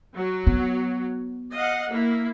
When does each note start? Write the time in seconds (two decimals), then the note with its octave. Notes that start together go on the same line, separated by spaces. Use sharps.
0.15 F#3
0.47 B3
1.53 D#5 F5 F#5
1.90 A#3 E4